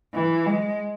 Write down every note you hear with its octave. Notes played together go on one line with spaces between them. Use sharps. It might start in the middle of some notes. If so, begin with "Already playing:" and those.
E3
G#3